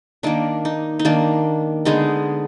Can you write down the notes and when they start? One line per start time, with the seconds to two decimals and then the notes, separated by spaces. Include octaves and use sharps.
0.23 D#3 A#3 D4
0.65 D#4
0.99 D#4
1.05 D#3 A#3 D4
1.85 D3 G#3 B3 D#4